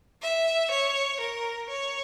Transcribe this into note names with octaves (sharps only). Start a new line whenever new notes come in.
E5
C#5
A#4
C#5